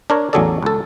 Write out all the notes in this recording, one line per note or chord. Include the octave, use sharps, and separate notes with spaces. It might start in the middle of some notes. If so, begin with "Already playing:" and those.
D4 A#4 C#5
A1 E2 F#3 G#4 A4 D5
C#2 A4